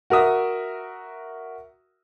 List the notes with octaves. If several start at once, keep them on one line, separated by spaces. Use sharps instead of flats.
F#4 A#4 E5 D#6